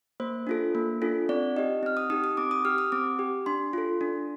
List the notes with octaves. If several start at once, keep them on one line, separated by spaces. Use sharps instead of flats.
A#3 C5
D4 F4 A4
A#3
D4 F4 A4
C4 D5
D#4 G4 D#5
C4 F6
D#6
D#4 G4 D#6
D#6
C4 D6
D#6
G4 F6
D#6
C4 D6
G4
D4 C6
F4 A4
D4